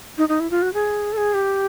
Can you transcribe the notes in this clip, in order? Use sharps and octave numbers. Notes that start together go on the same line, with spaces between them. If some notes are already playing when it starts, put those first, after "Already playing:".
D#4
D#4
E4
F4
F#4
G#4
A4
G#4
G4